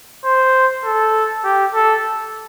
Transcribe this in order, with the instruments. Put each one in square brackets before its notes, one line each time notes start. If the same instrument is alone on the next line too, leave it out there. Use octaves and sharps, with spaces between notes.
[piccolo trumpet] C5
A4
G4
A4